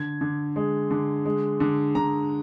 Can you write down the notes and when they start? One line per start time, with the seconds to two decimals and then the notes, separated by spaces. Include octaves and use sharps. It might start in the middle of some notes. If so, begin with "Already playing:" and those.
Already playing: D3 G#6
0.21 D3
0.56 G#3
0.91 D3
1.26 G#3
1.60 D3
1.95 D3 A#5